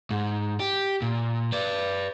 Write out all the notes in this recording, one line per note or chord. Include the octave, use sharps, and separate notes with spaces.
G#2
G4
A#2
B4 D5